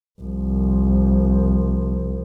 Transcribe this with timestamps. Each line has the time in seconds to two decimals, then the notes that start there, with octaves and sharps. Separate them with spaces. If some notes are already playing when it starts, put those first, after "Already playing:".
0.21 C2 F3